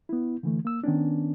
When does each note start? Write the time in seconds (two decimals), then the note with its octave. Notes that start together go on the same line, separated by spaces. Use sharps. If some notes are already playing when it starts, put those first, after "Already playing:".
0.09 B3 E4
0.43 D3 E3 A3
0.65 A#3 E6
0.84 D#3 B3 C#4 D4